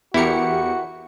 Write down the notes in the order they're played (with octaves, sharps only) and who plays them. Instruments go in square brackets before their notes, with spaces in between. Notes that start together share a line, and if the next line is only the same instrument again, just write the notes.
[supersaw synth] E2 G4 C#7 [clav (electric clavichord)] E4 A#4 [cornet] F#4